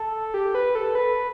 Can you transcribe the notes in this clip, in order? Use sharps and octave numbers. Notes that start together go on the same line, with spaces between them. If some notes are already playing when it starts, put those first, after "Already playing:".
Already playing: A4
G4
B4
A4
B4